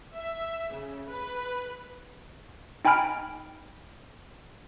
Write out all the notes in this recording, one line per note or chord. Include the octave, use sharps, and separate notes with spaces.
E5
C#3
B4
D#4 G5 G#5 B5 F6 D7